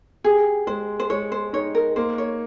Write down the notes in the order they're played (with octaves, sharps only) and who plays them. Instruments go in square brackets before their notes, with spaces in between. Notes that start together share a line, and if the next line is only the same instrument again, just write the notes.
[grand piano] G4 [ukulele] G#4
[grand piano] G#3 [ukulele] C5
[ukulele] C5
[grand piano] G#3 [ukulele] C#5
[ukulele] C5
[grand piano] D#4 [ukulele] C#5
[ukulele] A#4
[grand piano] A#3 [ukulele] C5
[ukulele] C#5